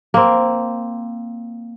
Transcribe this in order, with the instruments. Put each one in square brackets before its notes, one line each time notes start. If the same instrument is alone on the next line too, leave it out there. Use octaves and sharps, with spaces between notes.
[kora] A#3 C4